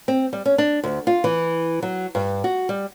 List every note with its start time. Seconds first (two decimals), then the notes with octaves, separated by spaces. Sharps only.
0.08 C4
0.33 G3
0.46 C#4
0.58 D4
0.83 D2
1.07 F4
1.24 E3
1.82 F#3
2.15 G2
2.44 F#4
2.69 G3